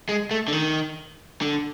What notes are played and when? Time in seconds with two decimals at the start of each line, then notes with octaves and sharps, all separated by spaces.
0.09 G#3
0.31 A3
0.48 D3
0.53 D#3
1.42 D3